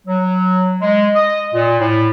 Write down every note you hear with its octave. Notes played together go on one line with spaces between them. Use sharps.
F#3
G#3
D#5
A#2
A2